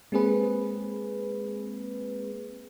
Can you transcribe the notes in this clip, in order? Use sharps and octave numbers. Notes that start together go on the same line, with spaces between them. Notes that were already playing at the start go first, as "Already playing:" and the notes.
G#3 A#3 C4 G#4 B4